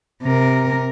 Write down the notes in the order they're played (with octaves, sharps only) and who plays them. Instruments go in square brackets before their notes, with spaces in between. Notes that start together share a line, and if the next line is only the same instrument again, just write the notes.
[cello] C3 A#4